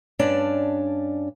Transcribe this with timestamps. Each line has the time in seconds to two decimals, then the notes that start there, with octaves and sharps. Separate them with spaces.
0.19 G2 C#4 D4 D5 A5